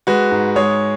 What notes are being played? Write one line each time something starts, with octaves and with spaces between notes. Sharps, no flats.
G#3 F#4 B4
G#2
G#3 G#4 C#5